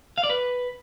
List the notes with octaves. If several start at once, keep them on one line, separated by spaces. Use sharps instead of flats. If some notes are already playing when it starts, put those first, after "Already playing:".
F5
D5
B4